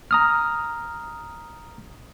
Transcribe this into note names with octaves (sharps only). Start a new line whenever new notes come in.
A#5 D#6 F6